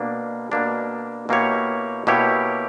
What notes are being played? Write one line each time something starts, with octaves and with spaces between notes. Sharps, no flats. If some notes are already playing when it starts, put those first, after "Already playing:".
Already playing: B2 A#3 D4
B2 A#3 D4
B2 A#3 E4 G4 C#5
B2 A#3 E4 G4 C#5